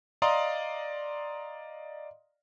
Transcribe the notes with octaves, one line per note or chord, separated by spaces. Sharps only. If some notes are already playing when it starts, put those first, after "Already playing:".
D5 D#5 F5 A#5 C6 D#6